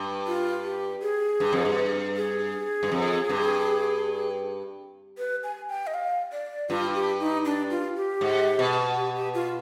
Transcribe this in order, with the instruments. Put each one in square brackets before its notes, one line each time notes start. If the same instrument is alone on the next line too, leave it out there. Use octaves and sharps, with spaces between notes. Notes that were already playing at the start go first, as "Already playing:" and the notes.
Already playing: [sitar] G2
[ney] F4
G4
G#4
[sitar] G2
F2
G2
[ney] G#4
[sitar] G2
F2
G2
[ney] B4
G#5
G5
D#5
F5
D5
[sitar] G2 [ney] F4
[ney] G4
D#4
D4
F4
G4
[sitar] G#2
B2
[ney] G4
G4
F4